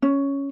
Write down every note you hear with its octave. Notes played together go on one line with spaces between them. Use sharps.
C#4